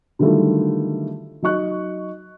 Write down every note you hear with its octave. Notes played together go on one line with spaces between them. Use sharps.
D3 D#3 F#3 G3 A3 F4
F#3 D#4 D#5 C#6 F#6